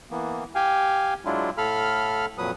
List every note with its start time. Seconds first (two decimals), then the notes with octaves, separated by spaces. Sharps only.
0.11 E3 A#3 B3
0.55 G4 F5 G5 G#5
1.25 F#3 G#3 D4 E4 F4
1.58 A2 A4 F5 B5 F6
2.38 F2 A#2 F#3 B4 D#6